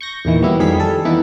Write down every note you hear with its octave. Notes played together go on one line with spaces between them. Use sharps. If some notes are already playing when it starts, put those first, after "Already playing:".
C#6 G6 A#6
E2 A#2 D#3 E3
F#3 G3 B3 E4
F2 D#3 G3 G#4 F5 B6
G3 A4
E3 B3 D#4 E4